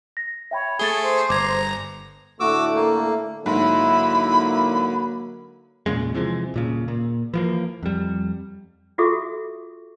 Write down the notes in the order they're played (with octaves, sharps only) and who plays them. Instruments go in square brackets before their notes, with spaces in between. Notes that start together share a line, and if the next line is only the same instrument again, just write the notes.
[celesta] A#6
[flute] C#5 [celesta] E5 G5 B5
[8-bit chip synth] A3 G#4 [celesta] A6 G7
[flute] C5
[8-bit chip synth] G1 A#5 [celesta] D6 G#6
[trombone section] A2 D3 A3 [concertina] F#4 D6 E6
[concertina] A#3
[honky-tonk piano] G#2 [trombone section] D3 F#3 A#3 [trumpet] E4 [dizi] B5
[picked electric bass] E2 A#2 C#3 G#3
C3 E3 F3 G#3
D#1 A#2 C#3
A#2
E3 F3 A#3
F2 G3
[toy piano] F4 F#4 G#4 A4 E5 C#6